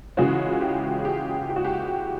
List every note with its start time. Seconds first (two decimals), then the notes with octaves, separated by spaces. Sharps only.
0.17 C#3 E3 G#3 C#4 F4 F#4
0.61 G4
0.99 G#4
1.05 G4
1.50 G4
1.56 F#4
1.65 G4